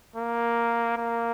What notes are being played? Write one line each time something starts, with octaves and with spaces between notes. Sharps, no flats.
A#3
A#3